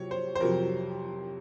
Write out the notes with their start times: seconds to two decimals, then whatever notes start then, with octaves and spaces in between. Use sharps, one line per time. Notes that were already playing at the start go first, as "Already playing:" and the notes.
Already playing: C3 F#3 C#5
0.11 C5
0.35 C5
0.40 F2 C3 F#3 A#4